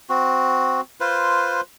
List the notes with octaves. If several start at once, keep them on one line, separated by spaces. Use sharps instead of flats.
C4 F#4
F4 B4 C5